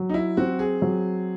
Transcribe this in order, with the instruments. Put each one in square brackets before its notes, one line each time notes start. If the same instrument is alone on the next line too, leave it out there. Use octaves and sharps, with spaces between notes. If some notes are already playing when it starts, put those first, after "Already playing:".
Already playing: [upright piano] F#3
[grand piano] D#4
E4
[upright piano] C4 [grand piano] F#4
[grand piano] G#4
[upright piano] F#3